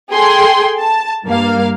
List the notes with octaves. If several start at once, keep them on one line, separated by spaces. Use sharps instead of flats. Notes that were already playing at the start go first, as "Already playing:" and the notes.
G#4 A4 G5 C6
A5
G2 A#3 F5